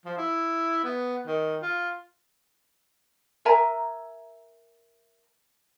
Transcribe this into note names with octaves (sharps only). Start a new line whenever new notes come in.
F3
E4
B3
D#3
F4
A#4 E5 G#5 A#5